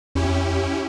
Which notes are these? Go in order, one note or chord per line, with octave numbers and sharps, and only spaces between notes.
F2 C#4 E4 G4